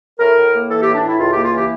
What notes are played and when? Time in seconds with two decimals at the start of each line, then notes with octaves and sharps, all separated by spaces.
0.20 A2 A#4
0.37 A2
0.53 A#3
0.69 E3 A4
0.82 G4
0.86 A2
0.95 D4
1.03 A2 E4
1.19 C#2 F4
1.31 G4
1.36 A#3
1.44 F4
1.52 E3 G4